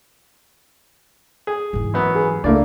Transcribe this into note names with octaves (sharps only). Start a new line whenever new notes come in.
G#4
G#2 E3
F#2 B3
G#4
C#2 A3 A#3 D4 D5